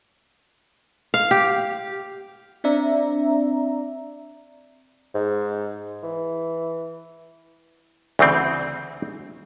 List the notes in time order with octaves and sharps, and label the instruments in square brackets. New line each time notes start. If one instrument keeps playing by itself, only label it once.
[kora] F5
G4
[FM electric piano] C4 D4 D5 E5 A#5
[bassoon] G#2
E3
[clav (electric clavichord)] D2 C#3 E3 C4